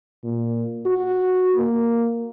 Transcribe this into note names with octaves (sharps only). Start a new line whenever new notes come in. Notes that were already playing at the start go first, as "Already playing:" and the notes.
A#2
F#4
A#3